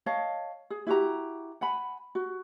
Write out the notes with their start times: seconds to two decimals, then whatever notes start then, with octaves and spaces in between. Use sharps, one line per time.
0.06 C#5 D#5 F5 A5
0.70 G#4
0.87 E4 F#4 G4 A#5
1.61 F#5 G#5 B5
2.15 F#4